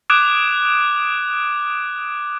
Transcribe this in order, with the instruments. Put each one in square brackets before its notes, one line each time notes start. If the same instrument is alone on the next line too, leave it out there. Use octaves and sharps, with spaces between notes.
[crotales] D6 D#6 F#6 G#6 D7 E7